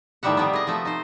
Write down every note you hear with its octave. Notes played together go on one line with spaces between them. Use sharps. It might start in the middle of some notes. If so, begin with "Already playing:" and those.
A2 D#3 F3 G3 E5 F#5
C3 G3 A3 B3
G#4 D#5
F3 A3
D#4 C5